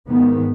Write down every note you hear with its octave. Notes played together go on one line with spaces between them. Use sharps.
G#2 D#3 B3